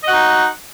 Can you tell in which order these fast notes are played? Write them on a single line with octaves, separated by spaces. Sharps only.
D#5 F#5 F#4 D#4